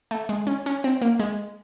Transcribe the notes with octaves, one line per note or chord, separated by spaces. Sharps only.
A3
G#3
C#4
C#4
C4
A#3
G#3